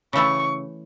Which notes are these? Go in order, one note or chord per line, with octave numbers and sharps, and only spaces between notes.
C#3 E3 A3 E4 C#6